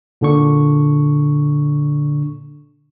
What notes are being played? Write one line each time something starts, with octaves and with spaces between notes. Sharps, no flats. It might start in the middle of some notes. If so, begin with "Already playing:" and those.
A#2 D3 D4 C#6